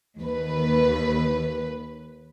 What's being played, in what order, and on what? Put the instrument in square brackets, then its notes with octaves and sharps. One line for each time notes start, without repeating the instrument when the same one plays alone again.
[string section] D#2 B4